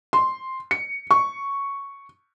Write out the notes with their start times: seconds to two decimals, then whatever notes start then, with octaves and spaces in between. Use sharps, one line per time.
0.13 C6
0.71 C#7
1.11 C#6